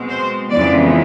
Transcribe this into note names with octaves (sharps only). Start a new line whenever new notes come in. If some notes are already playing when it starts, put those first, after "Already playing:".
Already playing: B2 G#3 C4
C5
F2 C#3 E3 G#3 B3 D5